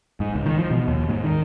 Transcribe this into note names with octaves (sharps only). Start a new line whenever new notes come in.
G#2
C#2
D#3
F3
B2
D#2
G#2
D#3